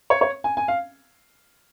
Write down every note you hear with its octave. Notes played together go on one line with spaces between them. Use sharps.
C#5
C#5
G#5
G#5
F5